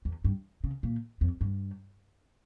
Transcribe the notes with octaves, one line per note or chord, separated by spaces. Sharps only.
E2
G2
C#3
A#2
F2
G2